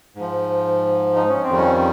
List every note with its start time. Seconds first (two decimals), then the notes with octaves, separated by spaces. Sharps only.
0.15 G#2 F3
1.16 D#4
1.29 C#4
1.43 C4
1.49 F2 D#3 G3
1.57 C#4